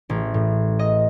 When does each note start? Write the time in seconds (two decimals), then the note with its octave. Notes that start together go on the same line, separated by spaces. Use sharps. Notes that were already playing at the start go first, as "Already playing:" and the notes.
0.10 A1
0.34 A2
0.79 D#5